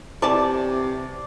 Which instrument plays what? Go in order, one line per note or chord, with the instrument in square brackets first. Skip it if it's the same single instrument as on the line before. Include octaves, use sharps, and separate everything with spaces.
[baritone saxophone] C3 [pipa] E3 A5 C#6 [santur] D5